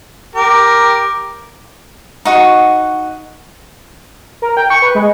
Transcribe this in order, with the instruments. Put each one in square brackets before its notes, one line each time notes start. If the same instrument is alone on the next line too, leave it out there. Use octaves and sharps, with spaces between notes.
[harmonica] G4 A#4
[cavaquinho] D#4 F#4 F#5 C#6
[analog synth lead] A#4
G5
C#6
B4
G#3